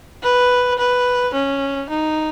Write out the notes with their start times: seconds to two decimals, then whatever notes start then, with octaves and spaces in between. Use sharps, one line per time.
0.23 B4
0.78 B4
1.34 C#4
1.89 D#4